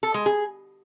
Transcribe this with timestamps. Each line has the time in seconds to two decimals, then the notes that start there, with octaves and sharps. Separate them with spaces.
0.03 A4
0.14 G#3
0.26 G#4